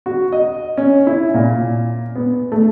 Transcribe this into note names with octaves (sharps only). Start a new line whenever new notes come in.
F#4
D#5
C#4
E4
A#2
B3
A3